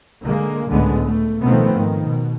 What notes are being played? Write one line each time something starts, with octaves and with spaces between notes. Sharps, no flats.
D3 G#3 A#3
G#1 C#2 A2 D3 G#3 B3
A3
B2 D#3 F3 A3 B3 C4
G#2 D#3
B2